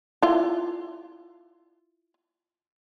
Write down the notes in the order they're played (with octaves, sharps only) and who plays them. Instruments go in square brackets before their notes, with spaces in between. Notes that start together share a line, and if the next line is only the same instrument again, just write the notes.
[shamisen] E4 F4